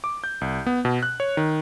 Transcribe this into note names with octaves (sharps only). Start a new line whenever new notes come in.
D6
G6
C2
B3
B2
F#6
C#5
D#3